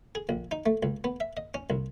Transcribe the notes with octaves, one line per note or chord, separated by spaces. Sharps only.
G#4
A#1
D#4
A3
C#2
B3
E5
D#5
C#4
C2